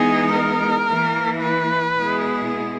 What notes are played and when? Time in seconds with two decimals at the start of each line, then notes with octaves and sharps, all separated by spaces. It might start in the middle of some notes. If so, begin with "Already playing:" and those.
Already playing: E3 G#3 B3 D#4 G#4
0.32 A#4
0.87 E3 A#3 E4
1.41 B4
1.95 B2 G#3 B3 E4 G#4